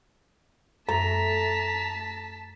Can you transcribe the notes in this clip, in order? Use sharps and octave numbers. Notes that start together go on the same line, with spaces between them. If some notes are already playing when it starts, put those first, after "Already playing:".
F#2 A3 A5 A#5 B6